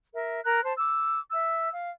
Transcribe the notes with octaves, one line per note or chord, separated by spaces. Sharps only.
A#4 E5
A#4 A#5 F#6
C5 A5
D6 E6
E5 E6
F5